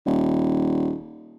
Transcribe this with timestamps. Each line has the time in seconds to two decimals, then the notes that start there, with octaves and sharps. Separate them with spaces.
0.06 D#1